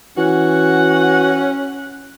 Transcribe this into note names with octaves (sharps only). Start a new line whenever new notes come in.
E3 C#4 F#4 F#5